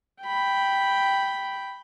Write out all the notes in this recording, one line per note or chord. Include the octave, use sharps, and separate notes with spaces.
G5 B5